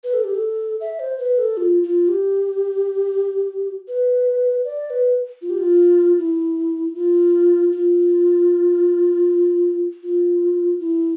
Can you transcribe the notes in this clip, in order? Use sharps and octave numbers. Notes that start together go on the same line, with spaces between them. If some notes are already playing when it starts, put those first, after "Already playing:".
B4
A4
G4
A4
E5
C5
B4
A4
F4
F4
G4
B4
D5
B4
F4
G4
F4
E4
F4
F4
F4
E4